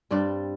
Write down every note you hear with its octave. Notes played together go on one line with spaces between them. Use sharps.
G2 G3 C4 D5